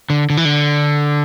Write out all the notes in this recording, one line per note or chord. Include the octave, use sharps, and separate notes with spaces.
D3
D3
E3
D3